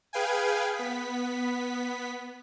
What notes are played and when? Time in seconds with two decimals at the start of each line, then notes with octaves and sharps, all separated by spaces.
0.13 G#4 B4 F5 G5 G#5
0.76 B3 B6